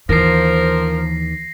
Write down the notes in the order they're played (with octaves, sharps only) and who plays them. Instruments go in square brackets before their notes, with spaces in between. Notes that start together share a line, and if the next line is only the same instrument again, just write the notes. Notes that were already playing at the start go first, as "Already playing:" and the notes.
[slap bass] D#2 [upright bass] E3 [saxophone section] F3 A#4 [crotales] A#6 C7